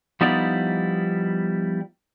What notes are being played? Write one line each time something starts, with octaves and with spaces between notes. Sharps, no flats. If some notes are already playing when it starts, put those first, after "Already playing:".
F3 G3 B3 D#4 E4 D5